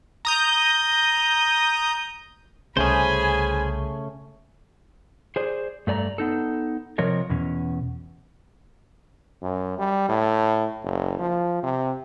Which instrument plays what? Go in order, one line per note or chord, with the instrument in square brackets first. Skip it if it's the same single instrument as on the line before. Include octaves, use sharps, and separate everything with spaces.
[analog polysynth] A#5 D#6 G6
[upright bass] C2 [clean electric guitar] C#3 A3 C#4 [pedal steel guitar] G#4 C5 [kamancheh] G#5 B5
[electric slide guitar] G#4 C5 D5
G2 A3 D5 A5 A#5
B3 D#4 A4
C3 F3 A#4 C#5 D#5
E2 B2 C#4
[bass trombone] F#2
G3
A2
F#1
F3
C3